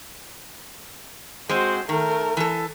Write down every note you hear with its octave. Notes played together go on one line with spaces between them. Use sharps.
G#3 C4 F#4 C5
D#3 A3 A#4
E3 A4